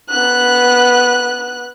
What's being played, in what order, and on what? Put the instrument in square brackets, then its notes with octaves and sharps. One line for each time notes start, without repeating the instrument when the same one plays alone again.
[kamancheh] B3 F#6